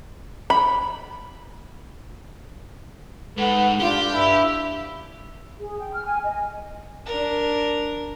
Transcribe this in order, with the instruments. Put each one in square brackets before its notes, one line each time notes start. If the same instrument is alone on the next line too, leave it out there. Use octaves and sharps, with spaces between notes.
[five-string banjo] B5
[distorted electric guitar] G#2 G#3 [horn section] A4 B4 F#5
[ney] D4 [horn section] F4 [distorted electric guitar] G4
[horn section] G2 [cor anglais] E4
[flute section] G#4
G5
F6
G#5
D#5
[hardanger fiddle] D4 A#4